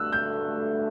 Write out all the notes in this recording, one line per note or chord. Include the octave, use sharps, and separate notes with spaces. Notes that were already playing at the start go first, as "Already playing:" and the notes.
Already playing: G2 D3 A3 D4 F#4 E6 F#6
G6